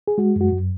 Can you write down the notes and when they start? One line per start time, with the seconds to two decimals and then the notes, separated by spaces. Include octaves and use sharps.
0.08 G#4
0.18 G#3 F#4
0.36 F#2 F#4
0.52 F#2